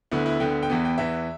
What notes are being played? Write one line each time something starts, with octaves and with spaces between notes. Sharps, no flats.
D2 D3 B3 E4
E4
D2 D3 B3 G5
G5
E2 E3 B3
G5
E2 E3 B3 E5